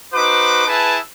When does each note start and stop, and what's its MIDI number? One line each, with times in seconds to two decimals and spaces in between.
0.14 0.64 63
0.14 0.64 66
0.14 0.64 71
0.14 0.64 72
0.14 0.64 86
0.67 0.97 64
0.67 0.97 68
0.67 0.97 71
0.67 0.97 81